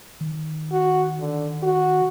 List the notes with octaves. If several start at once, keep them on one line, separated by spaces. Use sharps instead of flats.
D#3
F#4
D3
F#4